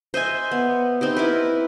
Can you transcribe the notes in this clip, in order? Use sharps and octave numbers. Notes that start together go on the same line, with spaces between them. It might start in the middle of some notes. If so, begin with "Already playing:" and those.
C5 D#5 E5 G#5
B3
C4 D#4 G4
E4 A#4 B4